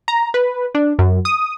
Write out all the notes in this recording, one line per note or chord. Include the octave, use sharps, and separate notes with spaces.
A#5
B4
D4
F#2
D#6